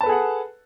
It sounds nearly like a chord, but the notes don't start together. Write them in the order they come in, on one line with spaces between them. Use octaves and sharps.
A5 B4 A4 G#4 F#5